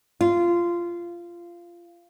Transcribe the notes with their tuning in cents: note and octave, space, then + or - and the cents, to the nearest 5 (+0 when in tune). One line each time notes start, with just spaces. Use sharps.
F4 -15